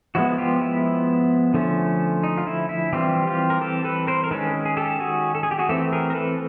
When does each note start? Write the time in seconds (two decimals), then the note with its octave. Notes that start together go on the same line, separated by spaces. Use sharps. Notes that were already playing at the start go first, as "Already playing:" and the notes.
0.15 F3 G#3 B3 E4 F#4
0.38 F4 G4
0.61 E4
1.54 D3 F3 A3 C#4
2.23 D#4
2.38 F4
2.47 E4
2.69 E4
2.93 E3 G3 C4 F4 G4
3.27 F4 G4
3.50 A#4
3.61 G4 A4
3.85 A4 B4
4.07 A#4 C5
4.24 A#4
4.31 D#3 G#3 C#4 A4 B4
4.65 G#4
4.77 G4 A4
5.00 F#4 G#4
5.35 A4
5.43 G#4
5.51 G4
5.59 F#4 G#4
5.69 E3 A3 C4 G4 A4
5.93 G#4 A#4
6.10 A#4
6.15 A4 B4